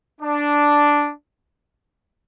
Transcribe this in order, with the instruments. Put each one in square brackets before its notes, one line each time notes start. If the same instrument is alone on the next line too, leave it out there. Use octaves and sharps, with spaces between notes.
[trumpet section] D4